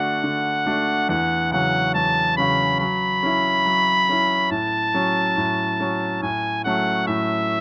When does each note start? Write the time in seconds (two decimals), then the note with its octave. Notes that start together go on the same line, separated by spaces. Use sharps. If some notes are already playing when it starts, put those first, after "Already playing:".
Already playing: D3 A3 D4 F#4 F#5
0.24 D3
0.66 A3 D4 F#4
1.09 E2 F#5
1.52 C#3 F#3 C#4 F#5
1.95 E2 A5
2.37 C#3 F#3 C#4 B5
2.80 F#3 B5
3.23 C#4 E4
3.65 F#3
4.09 C#4 E4
4.51 A2 A5
4.94 F#3 C#4
5.37 A2
5.80 F#3 C#4
6.22 A2 G#5
6.65 F#3 A3 C#4 F#5
7.08 A2 E5